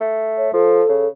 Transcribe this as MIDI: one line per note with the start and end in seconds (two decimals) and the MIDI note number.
0.01 0.51 57
0.37 0.49 73
0.53 0.83 53
0.53 1.08 69
0.89 1.07 49